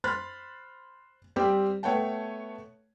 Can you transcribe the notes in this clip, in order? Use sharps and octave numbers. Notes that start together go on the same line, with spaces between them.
C5 B5 C6 F6 F#6 A6
G3 C4 G4
A3 B3 C#5 F#5 G5 A5